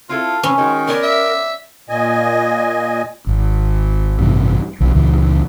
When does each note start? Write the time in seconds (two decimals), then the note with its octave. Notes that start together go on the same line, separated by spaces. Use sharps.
0.09 C4 E4 F4 A4
0.43 C3 C4 C#4 B4
0.58 D#3 G#3 F#4
0.88 B3 A#4 C#5 D5
1.03 E5
1.89 A#2 D#5 G#5
3.27 G#1
4.19 A1 G2 C3
4.80 B1 F3
4.95 C#2 A#2 C#3 E3